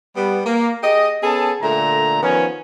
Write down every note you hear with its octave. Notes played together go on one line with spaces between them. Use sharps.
G3 B3
A#3
G4 G#4 D#5
B3 C#4 G#4 A4 A5
A#2 D3 A3 A#5
D#3 F3 B3 C#4